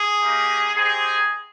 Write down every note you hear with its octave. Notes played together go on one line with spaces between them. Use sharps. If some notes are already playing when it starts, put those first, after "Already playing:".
Already playing: G#4
A#3 D#4 G4
C4 D#4 G4 G#4